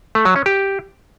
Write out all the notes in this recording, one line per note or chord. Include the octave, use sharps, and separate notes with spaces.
A3
F#3
C#4
G4